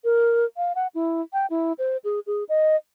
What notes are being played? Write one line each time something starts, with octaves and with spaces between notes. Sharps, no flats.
A#4
F5
F#5
E4
G5
E4
C5
G#4
G#4
D#5